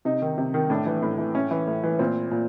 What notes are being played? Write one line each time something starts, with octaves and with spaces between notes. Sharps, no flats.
C3 D#4
D#3
C3
D#3
A2 D4
E3
A2
E3
A2 C#4
E3
A2
E3
A#2 C4
A#2